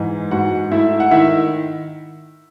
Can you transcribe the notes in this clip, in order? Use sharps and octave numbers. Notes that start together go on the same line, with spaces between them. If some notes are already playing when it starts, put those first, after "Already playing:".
Already playing: G#2 E3
G#2 F#4 F#5
A3 E4 E5
F#5
D#3 E4 E5